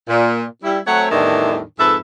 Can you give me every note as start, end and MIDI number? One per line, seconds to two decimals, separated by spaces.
0.08 0.44 46
0.63 0.79 55
0.63 0.79 64
0.87 1.06 54
0.87 1.06 57
0.87 1.06 60
0.87 1.06 73
0.87 1.06 78
1.11 1.61 40
1.11 1.61 45
1.11 1.61 51
1.11 1.61 52
1.11 1.61 55
1.11 1.61 62
1.80 1.97 41
1.80 1.97 44
1.80 1.97 69
1.80 1.97 71
1.80 1.97 76